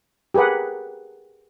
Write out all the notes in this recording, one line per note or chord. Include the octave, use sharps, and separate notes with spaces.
G4 G#4 A#4 B4 F#5